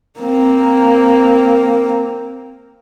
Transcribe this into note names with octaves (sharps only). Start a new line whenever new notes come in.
A#3 C4